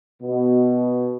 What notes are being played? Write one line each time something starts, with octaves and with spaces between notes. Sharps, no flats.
B2